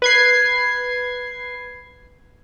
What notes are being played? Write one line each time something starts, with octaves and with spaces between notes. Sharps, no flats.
B4 G#6 C7